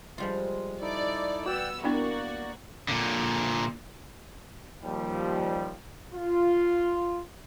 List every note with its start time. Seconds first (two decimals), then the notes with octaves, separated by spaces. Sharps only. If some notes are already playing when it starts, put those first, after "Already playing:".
0.18 F3 G3 G#3 F4
0.81 D#4 E4 A4 D5
1.46 B3 F#4 D5 F#5 G5 E6
1.84 A#3 B3 D4 E4 F#4 D5
2.88 A#2 D3
4.83 D#2 F3 G3
6.14 F4